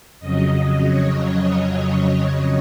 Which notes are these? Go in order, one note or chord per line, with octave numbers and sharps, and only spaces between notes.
F2 C#3 F#3 D#5
D#5
C#5
D#5